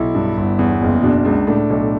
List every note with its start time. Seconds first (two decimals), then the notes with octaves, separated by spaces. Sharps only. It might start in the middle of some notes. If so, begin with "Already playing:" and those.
Already playing: B1 E4
0.15 G2
0.37 G1
0.59 E2
0.82 F#1
1.03 B2 D4
1.25 C#2
1.47 A2 D4
1.70 B1